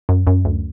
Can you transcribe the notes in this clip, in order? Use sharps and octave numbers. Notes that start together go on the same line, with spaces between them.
F#2
F#2
D2